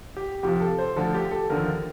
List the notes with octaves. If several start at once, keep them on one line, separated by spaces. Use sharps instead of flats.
G4
F2 C3 F3 G4
A4
C5
D2 D3 F3 A4
G4
A4
D#2 D3 F3 A#4